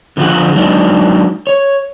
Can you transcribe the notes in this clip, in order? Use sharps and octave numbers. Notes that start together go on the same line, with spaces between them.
D3 F3 D#4 F4 G#4 F#5
F#3 G#3 D4 D#4
C#5